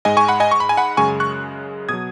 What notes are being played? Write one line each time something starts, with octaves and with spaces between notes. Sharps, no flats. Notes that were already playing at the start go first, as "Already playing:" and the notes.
G#2 G#3 D#5 G#5
G#5 C#6
F#5 B5
D#5 G#5
C#6
B5
G#5
F#5 B5
F#2 C#3 G#3 G#5 C#6
C#6 F#6
B2 F#3 D#6 G#6